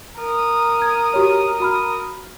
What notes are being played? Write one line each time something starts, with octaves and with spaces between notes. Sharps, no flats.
A#4 D#6
G#6
F#4 G4 C#5
F#4 B5 F6